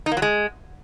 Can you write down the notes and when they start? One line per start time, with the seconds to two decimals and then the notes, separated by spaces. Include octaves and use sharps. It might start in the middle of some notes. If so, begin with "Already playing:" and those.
0.06 D#4
0.11 A#3
0.17 F#3
0.22 G#3